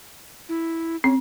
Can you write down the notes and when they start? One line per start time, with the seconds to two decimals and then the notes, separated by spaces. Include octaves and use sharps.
0.49 E4
1.04 C4 C#4